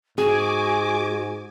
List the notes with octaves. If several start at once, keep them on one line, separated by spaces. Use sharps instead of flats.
G#2 F#4 G#4 G#5 D6